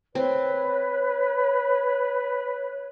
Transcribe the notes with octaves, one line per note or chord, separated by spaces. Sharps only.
C4 B4 C#5